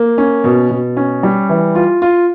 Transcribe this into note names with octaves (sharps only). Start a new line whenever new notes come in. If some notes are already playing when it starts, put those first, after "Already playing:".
Already playing: A#3
C#4
B2
B2
C#4
G3
E3
F4
F4